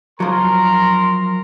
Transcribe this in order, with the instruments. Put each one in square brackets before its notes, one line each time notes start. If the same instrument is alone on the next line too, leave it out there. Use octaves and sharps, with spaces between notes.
[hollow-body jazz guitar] F3 F#3 [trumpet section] A#4 A#5 C6